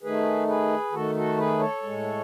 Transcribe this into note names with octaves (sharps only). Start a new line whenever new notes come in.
D#3 A3 G#4 B4
G#4 B4
D#3 A3 F#4 A4
F#4 A4
G#4 B4
A4 C#5
A2 G#3